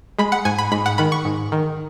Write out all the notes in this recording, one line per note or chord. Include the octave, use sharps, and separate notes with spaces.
G#3 B5
F#5
G#2 G#5
B5
G#2 B5
F#5
D#3 B5
C#6
G#2
D#3